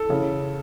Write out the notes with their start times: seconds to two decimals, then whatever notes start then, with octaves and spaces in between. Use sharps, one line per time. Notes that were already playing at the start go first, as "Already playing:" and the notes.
Already playing: A4
0.09 C#3 E3